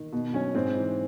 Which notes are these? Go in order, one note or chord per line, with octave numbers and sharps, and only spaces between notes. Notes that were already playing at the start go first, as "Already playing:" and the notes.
Already playing: D#3
B2
F#3 C#4
G#2 C4
E3